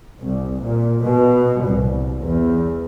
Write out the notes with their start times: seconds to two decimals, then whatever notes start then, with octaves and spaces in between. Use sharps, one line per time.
0.21 C2
0.63 A#2
1.04 B2
1.66 C2
2.22 E2